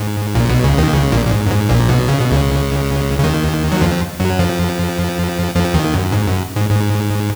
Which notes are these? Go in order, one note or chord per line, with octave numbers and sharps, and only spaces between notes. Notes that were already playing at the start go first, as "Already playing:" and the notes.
Already playing: G#2
A#1 A#2
B1 B2
C#2 C#3
D#2 D#3
C#2 C#3
A#1 A#2
A#2
G#2
F#2
G#2
A#1 A#2
B1 B2
C#3
B2
C#2 C#3
C#3
D#2 D#3
F#3
F2 F3
F#2 F#3
F2 F3
F2 F3
D#2 D#3
F#2
G#2
F#2
G#2
G#2